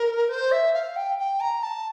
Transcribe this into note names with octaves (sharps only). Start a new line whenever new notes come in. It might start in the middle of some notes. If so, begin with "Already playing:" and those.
Already playing: A#4
C5
E5
F5
G5
G5
A#5
A5